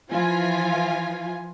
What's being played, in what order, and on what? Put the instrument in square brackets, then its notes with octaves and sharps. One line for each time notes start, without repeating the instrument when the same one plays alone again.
[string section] E3 F3 F4 G#5